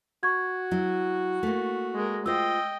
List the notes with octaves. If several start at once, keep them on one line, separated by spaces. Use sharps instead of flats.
F#4 C#6 G#6
F#3 E4
A3 A#3
G#3 A#4
F4 C5 D#5 G5 E6